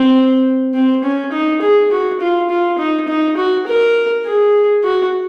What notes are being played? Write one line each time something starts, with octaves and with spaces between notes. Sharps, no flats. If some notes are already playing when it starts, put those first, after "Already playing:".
Already playing: C4
C4
C#4
D#4
G#4
F#4
F4
F4
D#4
D#4
F#4
A#4
G#4
F#4